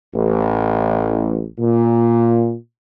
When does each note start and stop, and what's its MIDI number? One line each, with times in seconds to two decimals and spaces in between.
0.15 1.46 33
1.59 2.56 46